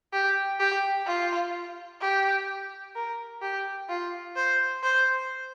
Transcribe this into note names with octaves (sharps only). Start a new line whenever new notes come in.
G4
G4
F4
G4
A#4
G4
F4
C5
C5